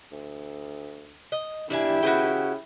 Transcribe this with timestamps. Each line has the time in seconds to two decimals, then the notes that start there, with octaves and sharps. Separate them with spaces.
0.12 D2
1.32 D#5
1.70 G2 G3 D4 E4 G4 G#5
2.03 C#3 F#4 B4 G5